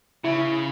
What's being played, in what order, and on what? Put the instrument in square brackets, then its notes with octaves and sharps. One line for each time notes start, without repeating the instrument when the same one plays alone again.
[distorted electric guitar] C#3 [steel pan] E4